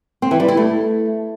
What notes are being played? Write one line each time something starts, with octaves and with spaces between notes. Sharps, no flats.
C4
E3
G3
E4
A3